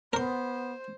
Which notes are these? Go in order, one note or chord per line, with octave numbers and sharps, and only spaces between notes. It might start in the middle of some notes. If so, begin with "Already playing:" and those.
B3 A#4 C5 C6